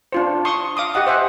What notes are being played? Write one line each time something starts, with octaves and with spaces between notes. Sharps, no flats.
D4 F4 C5
C6 C#6 D#6
F5 D6 D#6
G4 D#5 F#5 D#6
C5 E5 F#5 G#5